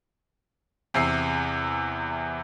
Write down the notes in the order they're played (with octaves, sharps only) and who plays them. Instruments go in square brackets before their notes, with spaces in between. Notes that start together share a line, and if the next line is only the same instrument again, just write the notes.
[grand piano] E2 C3 C7